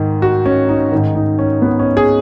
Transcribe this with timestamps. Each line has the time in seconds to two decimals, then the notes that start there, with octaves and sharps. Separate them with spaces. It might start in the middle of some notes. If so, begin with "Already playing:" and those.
Already playing: G#2 D#3
0.22 F#4
0.46 C#4
0.69 D#4
0.92 G#2 D#3
1.15 D#4
1.39 C#4
1.62 B3
1.79 C#4
1.97 G#4